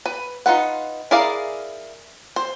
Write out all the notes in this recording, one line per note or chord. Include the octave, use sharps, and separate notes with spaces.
B4
D#4 F4 B4 F#5
E4 G#4 A#4 D5 F5
C5